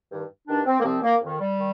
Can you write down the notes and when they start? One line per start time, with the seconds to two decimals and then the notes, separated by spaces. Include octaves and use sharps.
0.12 G2 D#3
0.48 G2 D#3 D4
0.66 C4
0.80 A#3
0.84 C2 C3 F3 C4
1.03 A#3
1.21 F2 D#3
1.40 G3
1.58 D#3